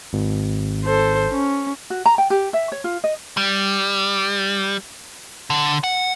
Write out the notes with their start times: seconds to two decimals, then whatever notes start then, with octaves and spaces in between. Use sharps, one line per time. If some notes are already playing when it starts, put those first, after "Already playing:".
0.13 G#1
0.85 A4 C5
1.32 C#4
1.90 F#4
2.06 A#5
2.18 G5
2.30 G4
2.53 E5
2.72 C#5
2.84 F4
3.04 D#5
3.37 G3
5.50 D3
5.84 F#5